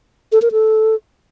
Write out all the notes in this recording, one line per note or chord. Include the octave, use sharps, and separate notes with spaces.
A4
A#4
A4